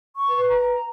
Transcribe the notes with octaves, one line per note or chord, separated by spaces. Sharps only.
C#6
B4
A#5